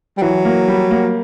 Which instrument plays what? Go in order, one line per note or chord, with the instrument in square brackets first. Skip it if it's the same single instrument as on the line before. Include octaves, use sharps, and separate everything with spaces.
[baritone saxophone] G3
[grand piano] E3 [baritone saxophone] F#3
[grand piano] A#3
G3
A#3